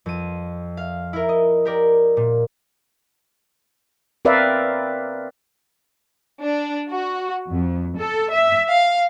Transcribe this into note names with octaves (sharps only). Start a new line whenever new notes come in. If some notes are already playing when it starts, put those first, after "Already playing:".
F2 D#7
F5
E4 A#4
D#5
G4 A#4 D5
A#2
C4 A#4 B4 D5 E5 F5
D4
F#4
F2
A4
E5
F5